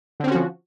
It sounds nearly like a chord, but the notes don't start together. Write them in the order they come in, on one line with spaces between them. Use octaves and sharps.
D3 C4 C#4 F#4 F3